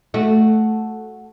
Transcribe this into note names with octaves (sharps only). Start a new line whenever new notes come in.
A3 F#4